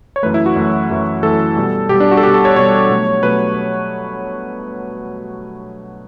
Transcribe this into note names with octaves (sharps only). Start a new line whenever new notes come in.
C#5
F#2 E3 A3 B4
E4
F#4
F#2 E3 A3
F#2 E3 A3
F#2 E3 A3 A4
B2 G3
B2 G4
G3
D4
F#4
A4
B2 G3 G4
A4
C#5
B2 G3 C#5
B2 F#3 A3
B2 F#3 A3 B4